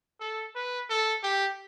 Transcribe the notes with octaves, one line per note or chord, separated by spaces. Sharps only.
A4
B4
A4
G4